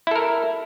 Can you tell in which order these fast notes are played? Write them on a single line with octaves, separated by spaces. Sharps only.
E4 A4 A#4